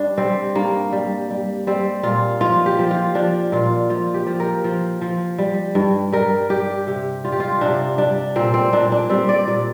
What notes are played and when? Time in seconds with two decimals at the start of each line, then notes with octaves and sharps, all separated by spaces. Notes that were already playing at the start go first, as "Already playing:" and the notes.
Already playing: G2 D4
0.18 G3 C4
0.55 G2 A#3
0.92 G3
1.30 G3
1.67 G3 C4
2.03 A#2 F4
2.41 F3 F4
2.66 G4
2.79 F3
2.91 F4
3.15 F3 D4
3.52 A#2 F4
3.90 F3 F4
4.14 G4
4.27 F3
4.40 A#4
4.64 F3
5.01 F3
5.38 G3
5.75 G2
6.12 G3 A#4
6.49 G3 G4
6.87 C3 G4
7.24 G3 F4
7.32 G4
7.40 F4
7.61 C3 D4
7.98 G3 D4
8.36 A#2 C4
8.54 C4
8.73 A#2 D4
8.92 D4
9.10 G3 C4
9.29 D5
9.47 A#2 D5